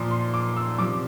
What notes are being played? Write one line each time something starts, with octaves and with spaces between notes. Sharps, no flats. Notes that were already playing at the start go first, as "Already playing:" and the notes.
Already playing: A#2 F3 C6
C6
D6
E6
C3 F3 D6